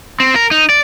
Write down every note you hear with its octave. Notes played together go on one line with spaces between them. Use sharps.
C4
A#4
D#4
D5